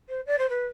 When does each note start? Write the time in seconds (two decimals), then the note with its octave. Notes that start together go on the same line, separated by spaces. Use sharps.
0.08 C5
0.26 D5
0.38 C5
0.49 B4